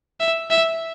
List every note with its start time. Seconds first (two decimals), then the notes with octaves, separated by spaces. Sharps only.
0.20 E5
0.50 E5